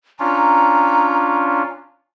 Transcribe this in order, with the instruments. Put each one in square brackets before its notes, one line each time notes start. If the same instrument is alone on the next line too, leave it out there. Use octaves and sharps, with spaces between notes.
[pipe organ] C#4 D4 F4 [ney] A#5